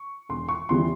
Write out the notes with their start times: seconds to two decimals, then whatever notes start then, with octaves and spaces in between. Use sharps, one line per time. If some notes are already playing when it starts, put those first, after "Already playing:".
Already playing: C#6
0.29 E1 C6
0.49 C#6
0.69 E2 C#3 E3 G3 C6